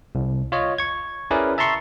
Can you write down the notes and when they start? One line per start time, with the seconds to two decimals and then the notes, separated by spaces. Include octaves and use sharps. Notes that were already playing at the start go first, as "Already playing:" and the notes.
0.15 C2
0.52 F4 C#5 D#5
0.78 C#6 G#6
1.31 C#4 E4 G#4 A#4 B4 D5
1.58 E5 A5 A#5 C6 C#6